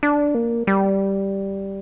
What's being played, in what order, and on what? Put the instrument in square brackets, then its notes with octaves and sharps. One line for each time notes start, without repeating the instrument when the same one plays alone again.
[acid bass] D4
A#3
G3